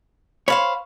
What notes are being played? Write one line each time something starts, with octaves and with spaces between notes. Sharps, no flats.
C5 C#5 F5 B5